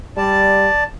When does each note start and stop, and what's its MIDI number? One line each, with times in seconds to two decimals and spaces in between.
0.17 0.68 55
0.17 0.84 74
0.17 0.84 81